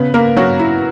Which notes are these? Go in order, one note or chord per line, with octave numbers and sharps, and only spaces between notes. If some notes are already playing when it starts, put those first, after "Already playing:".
Already playing: C#3 B3 B4
A#3 A#4
F#3 C#4 F#4
E4